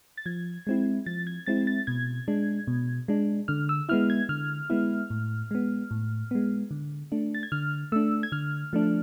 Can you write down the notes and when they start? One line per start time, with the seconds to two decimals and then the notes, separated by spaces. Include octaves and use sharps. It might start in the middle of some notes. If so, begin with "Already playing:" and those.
0.17 A6
0.26 F3 G#6
0.67 G#3 C4 E4
1.06 F3 A6
1.27 G#6
1.46 G#3 C4 E4 A6
1.67 A6
1.87 B2 G#6
2.28 G#3 D4
2.67 B2
3.08 G#3 D4
3.48 D3 F6
3.69 E6
3.89 G#3 B3 E4 F6
4.10 G#6
4.29 D3 F6
4.70 G#3 B3 E4
5.10 A2
5.51 G#3 B3
5.91 A2
6.31 G#3 B3
6.71 D3
7.12 A3 D4
7.34 A6
7.43 G#6
7.52 D3 F6
7.92 A3 D4 E6
8.23 G#6
8.32 D3 F6
8.73 F3 A3 D4